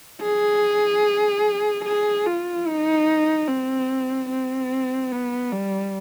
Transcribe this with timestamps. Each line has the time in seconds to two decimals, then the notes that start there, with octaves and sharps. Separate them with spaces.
0.22 G#4
1.85 G#4
2.26 F4
2.67 D#4
3.48 C4
4.30 C4
5.12 B3
5.52 G3